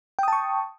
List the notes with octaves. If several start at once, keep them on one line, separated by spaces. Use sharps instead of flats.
G5 A5 C#6 D#6